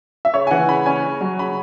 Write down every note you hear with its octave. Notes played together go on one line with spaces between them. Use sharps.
E5
C#3 C#5
G#5
E3 F#5
C#3 B5
C#4 G#5
C#3
F#3
C#3 B5